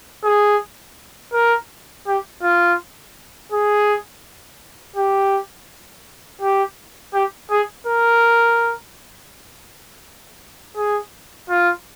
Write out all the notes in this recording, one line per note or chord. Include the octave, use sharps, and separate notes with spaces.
G#4
A#4
G4
F4
G#4
G4
G4
G4
G#4
A#4
G#4
F4